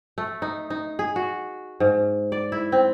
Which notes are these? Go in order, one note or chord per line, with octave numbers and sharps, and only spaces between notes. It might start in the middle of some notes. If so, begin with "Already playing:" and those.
A3
D#4
D#4
G#4
F#4
G#2
D5
E4
C4